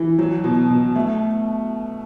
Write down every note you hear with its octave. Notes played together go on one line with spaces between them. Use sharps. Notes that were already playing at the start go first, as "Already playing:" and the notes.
Already playing: E3
F#3
B2
B2
A3